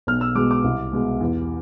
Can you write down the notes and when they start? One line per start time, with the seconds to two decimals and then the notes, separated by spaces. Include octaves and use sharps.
0.07 B1 F6
0.21 E6
0.35 B2 G#3 D6
0.51 D6
0.64 C2
0.93 B2 G#3
1.20 E2